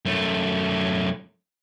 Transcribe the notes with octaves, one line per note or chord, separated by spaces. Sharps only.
F#2 A3